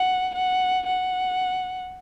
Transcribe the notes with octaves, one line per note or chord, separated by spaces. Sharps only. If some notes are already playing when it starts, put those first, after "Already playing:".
Already playing: F#5
F#5
F#5